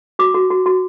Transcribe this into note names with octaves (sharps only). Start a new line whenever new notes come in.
F#4 D6
F#4
F#4
F#4